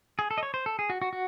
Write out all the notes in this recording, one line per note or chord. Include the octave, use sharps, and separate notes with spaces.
G#4
A4
D#5
C#5
C5
A4
G#4
F#4
F#4
F#4